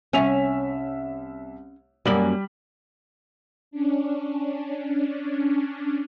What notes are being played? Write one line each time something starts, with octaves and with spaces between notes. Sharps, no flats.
C2 C#4 E5 F7
F#2 G3 A#3 D5 F#7
C#4 D4